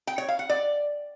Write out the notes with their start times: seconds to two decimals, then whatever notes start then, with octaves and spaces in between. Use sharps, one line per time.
0.07 G5
0.18 C#5
0.28 F5
0.39 F#5
0.49 D5